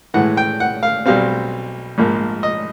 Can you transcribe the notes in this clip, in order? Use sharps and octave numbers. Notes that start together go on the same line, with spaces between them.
A2 E3 G#3 F#5
G5
F#5
F5
B1 B2 G3 C4 F5
A#1 G#2 F3 A#3
D#5